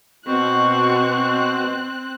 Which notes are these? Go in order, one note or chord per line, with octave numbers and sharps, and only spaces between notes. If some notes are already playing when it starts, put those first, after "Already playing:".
B2 C4 C#6 F#6